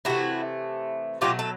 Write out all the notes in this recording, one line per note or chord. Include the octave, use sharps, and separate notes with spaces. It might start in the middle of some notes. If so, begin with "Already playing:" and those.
C3 E3 A3 E4 F#4
B2 F#3 A3 F4 G4
A4